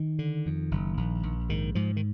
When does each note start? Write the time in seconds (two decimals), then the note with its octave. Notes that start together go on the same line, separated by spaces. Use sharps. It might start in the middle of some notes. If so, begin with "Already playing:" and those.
Already playing: D#3
0.19 D3
0.46 F2
0.71 F#1
0.97 A#1
1.23 A#1
1.49 G#2 D#3
1.75 G#2 F3
1.96 D#3